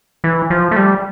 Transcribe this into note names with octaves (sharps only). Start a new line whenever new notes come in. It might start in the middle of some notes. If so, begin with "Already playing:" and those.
E3
F3
A3
G3